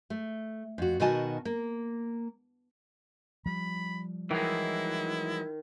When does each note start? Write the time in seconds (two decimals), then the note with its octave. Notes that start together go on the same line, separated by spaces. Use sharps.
0.10 A3
0.78 F2 F#4
1.00 B2 D#3 F#4 D#5 G#5 A5
1.45 A#3
3.46 F3 G3 B5
4.31 D#3 E3 F#3 G#3 E4